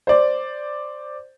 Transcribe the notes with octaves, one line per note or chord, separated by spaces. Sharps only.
C5 D5